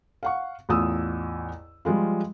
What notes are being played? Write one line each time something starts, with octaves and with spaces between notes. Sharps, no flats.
F5 F#5 C#6
A1 E2 F4 D#6 E6
F3 G3 G#3 F4